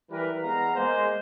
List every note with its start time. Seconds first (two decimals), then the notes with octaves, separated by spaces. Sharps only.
0.11 E3 G3 E4 A#4 B4
0.43 E2 G#3 B3 F5 A#5
0.76 G#3 A#3 C5